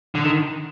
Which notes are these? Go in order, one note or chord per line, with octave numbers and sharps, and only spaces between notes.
D3
D#3